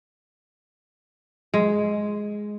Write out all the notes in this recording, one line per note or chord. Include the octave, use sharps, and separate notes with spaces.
G#3